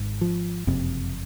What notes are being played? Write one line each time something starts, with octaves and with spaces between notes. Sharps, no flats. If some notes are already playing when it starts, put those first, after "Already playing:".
Already playing: G#1 G#2
F3
F#1 F2 C3